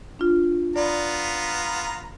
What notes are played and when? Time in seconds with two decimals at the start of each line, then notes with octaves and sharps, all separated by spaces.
0.19 D4 F4
0.76 B3 F4 D5 A#5